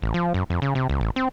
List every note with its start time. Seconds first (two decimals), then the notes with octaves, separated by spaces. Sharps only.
0.02 A1
0.14 F3
0.34 F#2
0.50 F2
0.62 C#3
0.75 C3
0.89 C#2
1.01 A1
1.16 C4